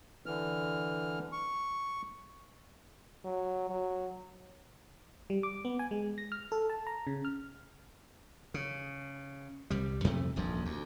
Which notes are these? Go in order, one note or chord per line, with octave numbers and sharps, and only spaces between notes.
D3 E3 F6
C#6
F#3
F#3
G3
D6
B3
G#5
G#3
A#6
F6
A4
A5
A#5
C#3
F6
C#3
C2 G3
F2 C3 A3
D#1 A#1 F2 F3
D2